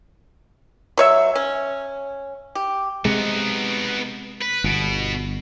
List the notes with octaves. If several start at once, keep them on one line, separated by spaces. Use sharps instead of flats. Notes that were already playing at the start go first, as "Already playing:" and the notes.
F#3 C#5 E5
C#4
G4
C3 G#3 B3 D#4
B4
G1 B2 B3